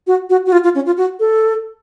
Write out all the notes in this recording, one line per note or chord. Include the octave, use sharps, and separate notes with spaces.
F#4
F#4
F#4
F4
F4
C#4
F4
F#4
A4